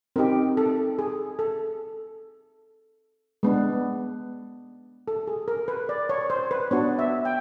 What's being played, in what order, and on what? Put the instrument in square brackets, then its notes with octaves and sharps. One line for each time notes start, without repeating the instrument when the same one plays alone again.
[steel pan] C4 D#4 G4 A#4
A4
G#4
A4
G#3 B3 D4
A4
G#4
A#4
B4
D5
C#5
C5
B4
B3 D4 F#4 C#5
E5
G5